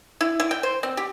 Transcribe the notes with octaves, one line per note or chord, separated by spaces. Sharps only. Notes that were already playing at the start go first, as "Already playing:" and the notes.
E4
E4
G5
C5
C4
G4